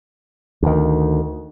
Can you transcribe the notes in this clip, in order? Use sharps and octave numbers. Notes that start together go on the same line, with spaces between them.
D2 D#3